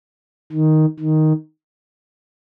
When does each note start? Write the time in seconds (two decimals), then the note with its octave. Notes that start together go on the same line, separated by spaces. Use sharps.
0.53 D#3
1.00 D#3